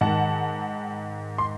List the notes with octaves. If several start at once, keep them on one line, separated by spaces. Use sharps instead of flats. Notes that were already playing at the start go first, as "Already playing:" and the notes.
G#2 D#3 F#5 A5
C6